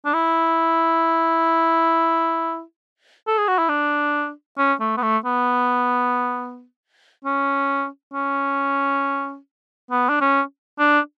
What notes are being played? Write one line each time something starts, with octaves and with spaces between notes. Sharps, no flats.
D4
E4
A4
G#4
F#4
E4
D4
C#4
A3
B3
A3
B3
C#4
C#4
B3
D4
C#4
D4